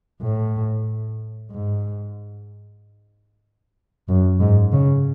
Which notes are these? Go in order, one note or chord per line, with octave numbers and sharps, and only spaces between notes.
A2
G#2
F#2
G#2
C#3